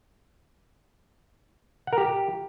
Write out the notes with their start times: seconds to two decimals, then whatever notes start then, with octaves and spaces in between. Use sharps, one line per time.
1.87 F#5
1.93 A#4
1.98 G4